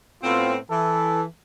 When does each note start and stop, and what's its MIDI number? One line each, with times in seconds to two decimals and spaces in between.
0.23 0.57 45
0.23 0.57 59
0.23 0.57 60
0.23 0.52 65
0.70 1.24 52
0.70 1.22 69